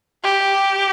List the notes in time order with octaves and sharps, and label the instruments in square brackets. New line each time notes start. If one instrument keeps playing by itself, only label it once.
[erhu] G4